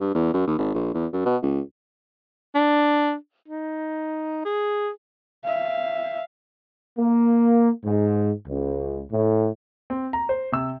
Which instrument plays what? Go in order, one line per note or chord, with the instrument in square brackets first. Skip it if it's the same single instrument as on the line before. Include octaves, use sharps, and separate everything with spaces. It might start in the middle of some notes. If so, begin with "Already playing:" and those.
[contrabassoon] G2
E2
F#2
D#2
G#1
A#1
E2
F#2
B2
C#2
[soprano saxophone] D4
D#4
G#4
[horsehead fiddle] E5 F5
[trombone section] A#3
G#2
C#2
A2
[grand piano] C4
A#5
C5
C3 E6